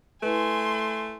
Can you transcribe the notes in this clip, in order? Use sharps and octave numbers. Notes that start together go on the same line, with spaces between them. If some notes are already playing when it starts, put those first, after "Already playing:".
A3 E4 B4 G#5 C6